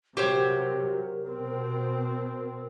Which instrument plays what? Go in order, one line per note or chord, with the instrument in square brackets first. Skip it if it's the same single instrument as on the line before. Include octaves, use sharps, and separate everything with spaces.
[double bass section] C3 F#3 [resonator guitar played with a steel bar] G4 C5 C#5 [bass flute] A#4
[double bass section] B2 C4